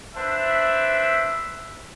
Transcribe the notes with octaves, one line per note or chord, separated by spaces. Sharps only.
D4 B4 C5 E5